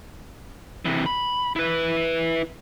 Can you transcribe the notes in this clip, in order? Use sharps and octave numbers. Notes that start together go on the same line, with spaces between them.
C3 E3
B5
E4 B4